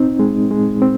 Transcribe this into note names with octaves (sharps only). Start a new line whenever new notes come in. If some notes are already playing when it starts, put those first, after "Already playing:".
Already playing: C4 D#4
G#3
G#3
C4